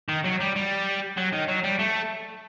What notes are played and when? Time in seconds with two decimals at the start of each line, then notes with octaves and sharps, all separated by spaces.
0.09 D#3
0.25 F#3
0.40 G3
0.56 G3
1.17 F#3
1.33 D#3
1.48 F#3
1.64 G3
1.79 A3